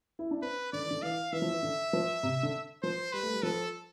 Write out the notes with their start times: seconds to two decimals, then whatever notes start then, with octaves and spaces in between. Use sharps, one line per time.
0.19 E4
0.31 D4
0.42 C4 B4
0.73 D3 D5
0.82 E3
0.91 D3
1.03 E3 F5
1.32 E3 E5
1.42 F3
1.51 E3
1.63 D3
1.93 F3
2.23 C3
2.43 D3
2.83 F3 C5
3.13 G3 B4
3.23 A3
3.33 G3
3.43 F3 A4